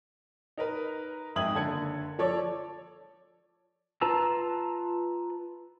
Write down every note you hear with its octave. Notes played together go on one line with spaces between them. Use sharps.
D#4 A#4 B4
F2 G#2 E5 D#6 G#6 F#7
F#1 D3 A4 G#6 C#7
F3 A4 C#5 D5
F4 B4 A5 A#5 E6